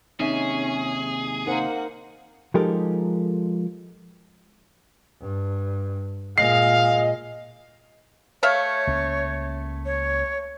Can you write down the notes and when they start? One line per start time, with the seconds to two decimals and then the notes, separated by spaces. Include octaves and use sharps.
0.20 D#2 C3 C#4 D#4 G#4 E5
1.46 A#3 D#4 A#4 C5 F#5
2.54 F3 G#3 D#4 G4 A4 A#4
5.21 G2
6.38 A#2 G#3 D#5 F5 C7
8.43 A3 C#5 E5 F5
8.87 C#2 A#3 C#4
9.86 C#5